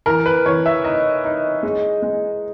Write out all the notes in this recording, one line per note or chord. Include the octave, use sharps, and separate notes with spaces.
E3 A#4
B4
E3 C#5
E5
D#4 D#5
D#4
G#3
G#3